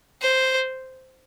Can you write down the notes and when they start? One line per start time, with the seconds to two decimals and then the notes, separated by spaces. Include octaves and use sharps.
0.22 C5